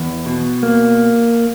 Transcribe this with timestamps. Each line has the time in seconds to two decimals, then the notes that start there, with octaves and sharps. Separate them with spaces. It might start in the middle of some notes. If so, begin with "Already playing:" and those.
Already playing: E2
0.26 B2
0.63 A#3